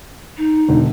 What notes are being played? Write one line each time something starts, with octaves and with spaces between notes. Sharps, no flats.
D#4
E1 D3